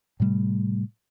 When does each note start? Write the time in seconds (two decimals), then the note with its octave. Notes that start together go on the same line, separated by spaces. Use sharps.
0.20 A2 C3 G3 A3